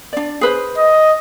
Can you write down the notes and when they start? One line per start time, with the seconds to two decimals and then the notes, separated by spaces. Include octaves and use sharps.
0.13 D4 D5
0.41 G#4 B4 C5
0.77 D#5